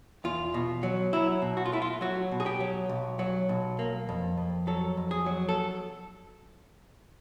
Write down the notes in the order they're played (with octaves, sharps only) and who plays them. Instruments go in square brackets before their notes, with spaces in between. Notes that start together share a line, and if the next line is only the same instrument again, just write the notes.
[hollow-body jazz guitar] E2 F4
B2
F#3
F#3 E4
B2
F#4
F4
A3 E4
F4
F#3 F#4
B2
G#4
G4
F#3
B1
F#3
B1
A#3
F2
F2
F#3 A4
F2
G#4
F#3
A4